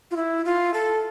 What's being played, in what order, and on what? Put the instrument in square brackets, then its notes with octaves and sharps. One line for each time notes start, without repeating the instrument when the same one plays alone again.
[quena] F4
E4
F4
A4